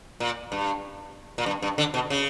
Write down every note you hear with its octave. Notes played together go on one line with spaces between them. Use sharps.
A#2
G2
A#2
G2
G2
D3
B2
C#3